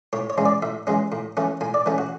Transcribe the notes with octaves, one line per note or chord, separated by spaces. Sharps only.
A2 C#5
C#5
E3 G#3 C#4
D5
A2 E5
E3 G#3 C#4
A2
E3 A3 C#4
A2 G#5
D5
E3 A3 C#4
F#4